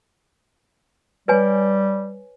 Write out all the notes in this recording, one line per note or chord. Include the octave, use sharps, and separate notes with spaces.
G3 B4 C#5 G#5